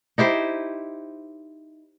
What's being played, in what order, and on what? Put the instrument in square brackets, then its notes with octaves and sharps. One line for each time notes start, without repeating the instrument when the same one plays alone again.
[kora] D#4 E4 G4 C5